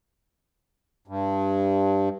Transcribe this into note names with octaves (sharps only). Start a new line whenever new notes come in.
G2